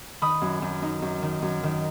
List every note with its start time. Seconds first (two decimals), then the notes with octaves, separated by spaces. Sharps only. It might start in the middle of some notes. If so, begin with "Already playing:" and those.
0.22 D#3 B5 D#6
0.41 F#2
0.62 F#2
0.82 D#4
1.02 F#2
1.22 D#3
1.42 F#2
1.63 D#3